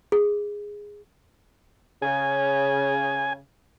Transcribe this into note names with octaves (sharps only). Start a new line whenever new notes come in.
G#4
C#3 G#5